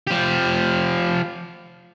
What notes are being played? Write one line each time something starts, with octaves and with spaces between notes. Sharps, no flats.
F3 G4